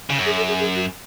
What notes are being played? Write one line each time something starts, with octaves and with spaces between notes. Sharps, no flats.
C#3
F#2
G#4
A4
G#4
G#4
F#4